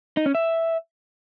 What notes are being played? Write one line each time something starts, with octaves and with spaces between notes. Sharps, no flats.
D#4
C#4
E5